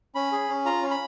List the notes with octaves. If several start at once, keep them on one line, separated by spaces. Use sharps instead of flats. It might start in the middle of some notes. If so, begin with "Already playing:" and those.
C#4 B5
G#4
C#4
F4 A#5
C#4
B5